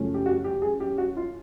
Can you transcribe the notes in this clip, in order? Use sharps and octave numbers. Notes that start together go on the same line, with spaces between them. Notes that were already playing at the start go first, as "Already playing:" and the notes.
Already playing: F#2 C#3 F3 A3 C#4
G4
F#4
G4
G#4
G4
F#4
F4